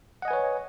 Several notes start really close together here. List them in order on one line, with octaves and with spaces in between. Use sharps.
F#5 D#5 G#5 B4 C#5